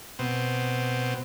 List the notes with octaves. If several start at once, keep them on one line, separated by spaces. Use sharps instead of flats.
B2 C4